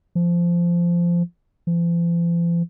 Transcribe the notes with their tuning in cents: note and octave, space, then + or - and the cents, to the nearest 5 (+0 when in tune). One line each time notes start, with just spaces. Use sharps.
F3 -15
F3 -45